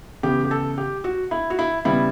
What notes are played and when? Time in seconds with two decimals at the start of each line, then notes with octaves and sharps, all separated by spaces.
0.23 C#3 E3 B3 G4
0.44 G4
0.51 A4
0.78 G4
1.04 F#4
1.31 E4
1.50 F#4
1.59 E4
1.85 C#3 G3 B3 E4